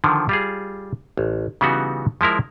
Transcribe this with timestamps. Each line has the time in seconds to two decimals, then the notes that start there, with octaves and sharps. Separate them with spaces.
0.04 D3 D#3 F3
0.29 G3 F4 G#4
1.17 A1
1.61 C#3 E3 G3 B3 D#4 F#4
2.21 F3 G#3 E4 A#4